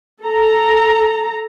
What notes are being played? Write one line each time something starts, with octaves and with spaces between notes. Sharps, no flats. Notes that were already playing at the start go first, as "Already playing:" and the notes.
A4 A#5